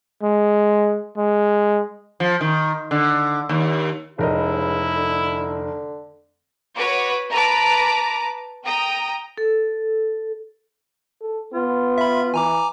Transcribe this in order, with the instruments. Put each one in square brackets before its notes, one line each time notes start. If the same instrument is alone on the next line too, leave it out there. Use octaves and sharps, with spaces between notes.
[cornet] G#3
G#3
[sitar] F3
D#3
D3
D#2
[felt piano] F1 A#4 D#5 [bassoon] C#2 [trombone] E4
[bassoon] D3
[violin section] F#4 B4 C#5 D6
B4 A5 A#5 D6
G5 A#5 D#6
[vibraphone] A4
[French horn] A4
[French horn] B3 [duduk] F4
[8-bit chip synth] E5 B5
[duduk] E3 [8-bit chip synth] G#5 A#5 D6